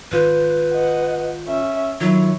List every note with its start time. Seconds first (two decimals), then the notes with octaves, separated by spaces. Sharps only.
0.12 G#1 F4 B4 G6
0.73 D#5 F#5
1.47 C#4 E5
2.01 D#3 F#3 E4 F4 C#5